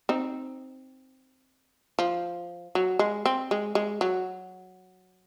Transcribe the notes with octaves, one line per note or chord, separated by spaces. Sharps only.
C4 D#4
F3
F#3
G#3
C4
G#3
G#3
F#3